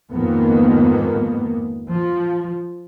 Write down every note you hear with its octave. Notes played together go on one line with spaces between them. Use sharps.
F2 G#2 D#3 A#3 B3
F3